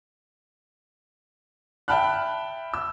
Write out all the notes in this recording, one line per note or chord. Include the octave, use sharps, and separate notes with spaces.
E5 G5 A5 B5 F6 F#6
E6